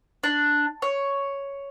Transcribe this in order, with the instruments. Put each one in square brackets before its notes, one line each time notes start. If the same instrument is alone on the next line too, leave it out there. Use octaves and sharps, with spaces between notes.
[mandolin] D4
C#5